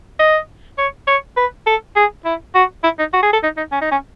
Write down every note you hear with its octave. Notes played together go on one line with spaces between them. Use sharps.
D#5
C#5
C#5
B4
A4
G#4
E4
F#4
E4
D#4
F#4
G#4
A4
D#4
D#4
C#4
D#4
C#4